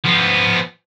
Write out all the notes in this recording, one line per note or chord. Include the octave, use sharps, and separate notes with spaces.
F3 B3